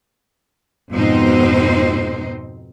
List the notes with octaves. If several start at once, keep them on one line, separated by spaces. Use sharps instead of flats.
F2 G#2 B2 C4 D#4 C5